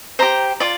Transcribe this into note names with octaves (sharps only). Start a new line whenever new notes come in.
G4 C5 A#5
F4 D5